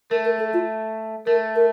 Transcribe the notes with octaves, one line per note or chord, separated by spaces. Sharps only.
A3 A#4
A#4
A4
F4
A3 A#4
A#4